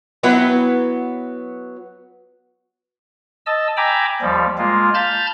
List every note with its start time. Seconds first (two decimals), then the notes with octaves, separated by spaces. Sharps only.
0.23 F#3 B3 E4
3.46 D#5 A5 E6
3.77 G5 G#5 A#5 B5 D6 E6
4.22 D#2 F3 G3
4.58 G#3 A#3 F4
4.94 A5 B5 F6 G6 A6